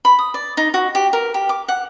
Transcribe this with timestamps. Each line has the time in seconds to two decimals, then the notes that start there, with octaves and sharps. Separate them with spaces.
0.05 B5
0.19 D#6
0.34 D5
0.57 D#4
0.74 F#4
0.95 G4
1.13 A#4
1.34 G4
1.49 D6
1.68 F#5